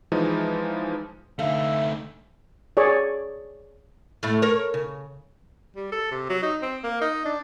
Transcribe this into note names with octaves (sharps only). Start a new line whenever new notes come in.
E3 F3 G#3 D#4
D3 A3 D#4 E5 F5
G#4 C#5 D5
A2 A3
A#4 C#5
C#3
G3
A4
C3
F#3
D#4
C4
A#3
D#4
D4